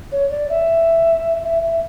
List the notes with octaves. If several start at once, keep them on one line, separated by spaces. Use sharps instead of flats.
C#5
D5
E5
E5
E5